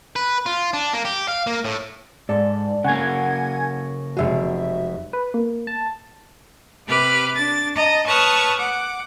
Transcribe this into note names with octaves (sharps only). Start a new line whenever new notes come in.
B4
F4
D4
A#3
G4
F5
A#3
A2
G#2 A4 D5
C#3 A#3 F#5 G#5 G#6
F1 G#3 F#4 E5
B4
A#3
A5
C3 G4 B4 D6 F6
D4 A6
D#5 A5 A#5
B4 C#5 A5 C#6 D#6 F6
F#5 D6